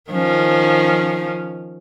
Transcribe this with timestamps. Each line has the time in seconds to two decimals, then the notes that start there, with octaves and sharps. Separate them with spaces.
0.11 D#3 F3 C#4